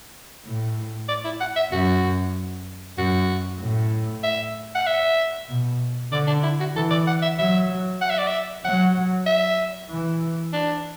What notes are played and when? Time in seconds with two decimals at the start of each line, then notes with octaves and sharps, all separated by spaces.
0.45 A2
1.08 D5
1.24 E4
1.41 F#5
1.56 E5
1.72 F#2 F#4
2.97 F#2 F#4
3.60 A2
4.23 E5
4.75 F#5
4.86 E5
5.49 B2
6.12 D3 D5
6.27 D4
6.43 E4
6.60 F#4
6.75 E3 A4
6.90 D5
7.07 F#5
7.22 E5
7.38 F#3 E5
8.01 F#5
8.10 E5
8.18 D5
8.28 E5
8.65 F#3 F#5
9.26 E5
9.90 E3
10.53 D4